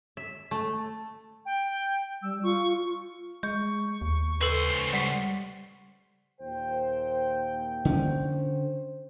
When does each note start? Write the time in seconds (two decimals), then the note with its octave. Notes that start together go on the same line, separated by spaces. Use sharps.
0.17 E5
0.51 A3
1.45 G5
2.22 G3 E6
2.43 F4 C#6
3.43 G#3 C#6 G6
4.02 D#2
4.41 C#2 A4 B4 C5
4.93 G3 F#5 B6
6.41 D#2 A#2 C5 G5
7.85 D3 C#4 C5